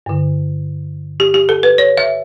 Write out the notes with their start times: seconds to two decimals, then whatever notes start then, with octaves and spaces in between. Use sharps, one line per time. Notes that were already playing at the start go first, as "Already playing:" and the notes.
0.06 G2 D3
1.20 G4
1.34 G4
1.49 A4
1.63 B4
1.78 C#5
1.98 E5